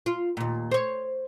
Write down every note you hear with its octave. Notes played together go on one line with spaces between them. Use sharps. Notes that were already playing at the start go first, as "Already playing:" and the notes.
F4
D#2 A#2
C5 C#5